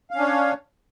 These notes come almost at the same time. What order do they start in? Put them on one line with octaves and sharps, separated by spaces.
F5 C#4 D4 C#5